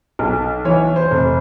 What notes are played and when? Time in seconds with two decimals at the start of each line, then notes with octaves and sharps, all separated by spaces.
0.19 B1
0.65 E3 C#5
0.96 C5
1.11 F1